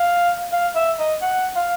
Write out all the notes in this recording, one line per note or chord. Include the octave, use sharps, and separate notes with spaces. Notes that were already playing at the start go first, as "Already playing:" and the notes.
Already playing: F5
F5
E5
D#5
F#5
F5